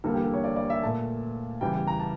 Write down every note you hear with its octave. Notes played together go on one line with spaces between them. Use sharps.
E2 D3 G3 A#3 A4
G4
A4
C#5
D5
D5
E5
A#2 A3 A5
E2 C#3 E3 G3 G5
G5
A#5
A5